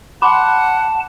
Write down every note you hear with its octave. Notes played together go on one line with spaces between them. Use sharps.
F#5 A5 B5 C6 D6